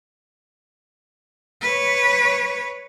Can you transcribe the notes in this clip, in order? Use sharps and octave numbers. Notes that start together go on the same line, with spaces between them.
B4 C#5